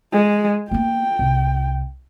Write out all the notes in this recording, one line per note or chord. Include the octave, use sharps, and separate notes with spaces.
G#3
A#3 B3 G5
C2